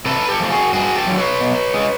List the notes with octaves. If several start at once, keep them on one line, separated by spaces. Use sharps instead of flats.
C3 A4 B4
G4 A4
F3 A3
F#4 G#4
G2 F#4 G#4
G4 A4
D3 F#3
B4 C#5
B2
G#3